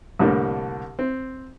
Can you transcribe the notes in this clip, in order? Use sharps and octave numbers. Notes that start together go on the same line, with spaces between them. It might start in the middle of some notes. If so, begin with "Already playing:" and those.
C2 A2 D3 G3 A#3
C4